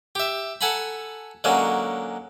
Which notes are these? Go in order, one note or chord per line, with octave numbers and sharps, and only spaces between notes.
G4 E5
A4 F#5 G#5 A#5 B5
D3 F#3 G#3 A#3 C#4